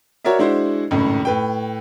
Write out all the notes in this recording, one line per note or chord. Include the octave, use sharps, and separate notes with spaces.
F#4 A#4 C#5 D5 E5
G#3 D4 E4 F#4 C5
G#1 C#2 F#2 A2
A2 B4 G5